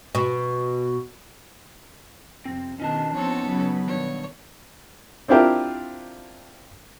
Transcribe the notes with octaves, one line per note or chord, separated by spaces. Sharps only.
B2
F2 C3 C4
B2 D#3 C#4 D#4 D#5 A5
F3 B3 C4 A4 C#5
C#3 F#3 B4
G2 B2 D#3 C#5
C4 D4 E4 F4 G4 A#4